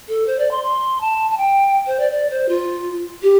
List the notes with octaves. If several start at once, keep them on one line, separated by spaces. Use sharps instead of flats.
A4
C5
D5
C6
C6
A5
A5
G5
C5
D5
D5
C5
F4
G4